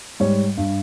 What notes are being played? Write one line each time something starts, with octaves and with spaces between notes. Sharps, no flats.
G#2 G3 C#5
G2